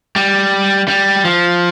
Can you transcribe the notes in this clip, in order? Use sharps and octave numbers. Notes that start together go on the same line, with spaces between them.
G3
G3
F3